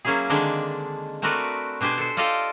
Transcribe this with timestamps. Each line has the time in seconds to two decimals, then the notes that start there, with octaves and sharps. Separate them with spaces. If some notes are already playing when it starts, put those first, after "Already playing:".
0.05 F#3 A#3 C#4 E4 G#4
0.30 D3 D#3 G#3 C4 D4
1.22 A3 C4 F#4 A#4 B4 D5
1.81 B2 D4 G4 C5 G#5
1.98 A4 C5
2.17 F4 A4 D5 D#5 F5 G5